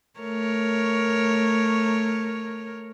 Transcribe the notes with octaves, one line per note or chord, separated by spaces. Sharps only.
A3 A#4 C#5